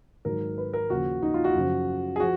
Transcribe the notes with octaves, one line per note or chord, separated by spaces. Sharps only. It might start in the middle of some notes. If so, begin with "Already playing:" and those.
G#2 D#3 F#3 A#4
B4
A#4
D#2 C#3 F3 F#4
D#4
F4
F#4
F#2 C#3 F3
G#4
F3 F#4